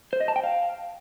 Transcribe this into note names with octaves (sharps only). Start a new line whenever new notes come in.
C5
D#5
A5
G5
F5